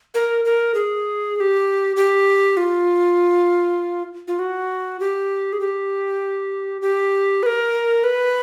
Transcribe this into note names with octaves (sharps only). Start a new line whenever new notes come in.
A#4
A#4
G#4
G#4
G4
G4
F4
F4
F#4
G4
G#4
G4
G4
B4
A#4
B4